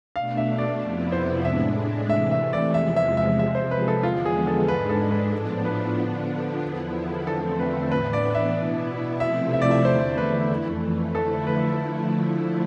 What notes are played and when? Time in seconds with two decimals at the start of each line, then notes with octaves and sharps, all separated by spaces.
0.16 B2 A3 D4 F5
0.37 E5
0.58 D5
0.81 F2 C3 F3 B3 E4
1.12 C5
1.45 A2 G#3 D4 E5
2.10 C3 E3 A3 E5
2.31 E5
2.53 D5
2.74 E2 C3 F3 G#3 E5
2.96 E5
3.17 E5
3.38 C3 F3 G#3 E5
3.55 C5
3.71 B4
3.88 A4
4.03 E2 D3 F3 G#3 B3 F4
4.25 G#4
4.47 A4
4.68 G#2 G#3 D4 B4
4.89 A4
5.11 B4
5.33 A2 F3 B3 D4 A4
5.65 B4
5.97 D3 F3 B3 D4
6.62 E2 D3 F3 B3 E4
7.27 E2 D3 F3 A3 C4 A4
7.60 B4
7.92 A2 E3 B3 D4 B4
8.13 D5
8.35 E5
8.56 B2 B3 E4
9.20 C3 F3 A3 C4 E4 E5
9.53 E5
9.62 D5
9.71 E5
9.85 E2 D3 A3 E4 C5
10.18 B4
10.50 F2 E3 A3
11.15 D3 F3 A3 E4 A4
11.47 B4